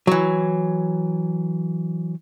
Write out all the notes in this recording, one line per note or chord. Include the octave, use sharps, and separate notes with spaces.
E3 F#3